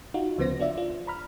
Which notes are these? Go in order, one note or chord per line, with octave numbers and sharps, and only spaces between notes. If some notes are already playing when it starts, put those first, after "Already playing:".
D#4 F4 F#4
D2 C#3 F3 B3 C5 A#6
D4 F4 D5 E5
F4
A#5 B5 F6